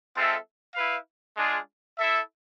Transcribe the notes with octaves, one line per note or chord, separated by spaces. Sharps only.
G#3 C4 F4 A4 E5
E4 B4 F5
G#3 D4 F4 G#4
E4 A4 E5